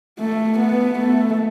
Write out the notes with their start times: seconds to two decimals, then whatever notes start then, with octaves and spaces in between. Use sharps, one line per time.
0.19 A3
0.59 B3
0.99 A3